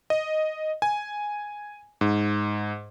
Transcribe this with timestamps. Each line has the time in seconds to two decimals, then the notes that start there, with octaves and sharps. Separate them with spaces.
0.10 D#5
0.82 G#5
2.01 G#2